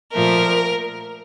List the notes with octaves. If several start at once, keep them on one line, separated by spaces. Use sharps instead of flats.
A#2 F3 A3 A#4